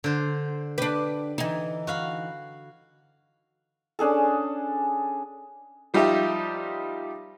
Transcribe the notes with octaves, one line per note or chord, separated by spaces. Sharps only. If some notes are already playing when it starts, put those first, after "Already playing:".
D3 C5
D4 G4 B4
E3 D#4
F#4 F5 B5
C#4 D4 G#4 A4
F3 G3 D#4 F4 G4 E5